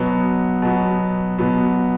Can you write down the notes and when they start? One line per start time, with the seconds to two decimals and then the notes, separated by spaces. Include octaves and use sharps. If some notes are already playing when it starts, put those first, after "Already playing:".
Already playing: B2 F#3 B3
0.62 B2 F#3 B3
1.38 B2 F#3 B3